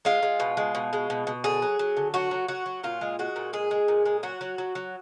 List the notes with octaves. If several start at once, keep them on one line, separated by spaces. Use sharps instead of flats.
G#3 F4
G#3
B2
G#3
B2
G#3
B2
B2
D3 G#4
F#3
F#3
D3
F#3 F#4
F#3
F#3 F#4
F#3
A#2 F4
G#3
G#3 F#4
A#2
G#3 G#4
G#3
A#2
G#3
F#3 F#4
F#3
F#3
F#3